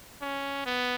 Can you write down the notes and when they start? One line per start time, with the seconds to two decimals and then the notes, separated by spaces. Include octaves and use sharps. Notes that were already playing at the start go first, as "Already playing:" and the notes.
0.22 C#4
0.66 B3